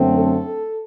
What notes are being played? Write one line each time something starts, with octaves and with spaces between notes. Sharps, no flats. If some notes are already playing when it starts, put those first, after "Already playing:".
Already playing: F#2 D3 F#3 A3 C4
A4